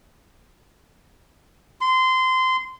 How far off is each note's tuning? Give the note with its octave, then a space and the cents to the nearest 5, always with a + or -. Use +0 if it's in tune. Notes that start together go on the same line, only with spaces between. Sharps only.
C6 -20